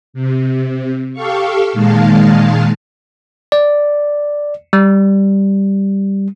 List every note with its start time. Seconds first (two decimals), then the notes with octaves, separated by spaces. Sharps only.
0.14 C3
1.13 G4 A4 F5 C#6
1.73 A#2 D#3 G#3 F5 A5
3.52 D5
4.73 G3